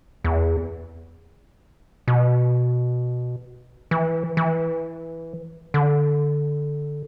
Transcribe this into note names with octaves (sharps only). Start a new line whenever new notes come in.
E2
B2
E3
E3
D3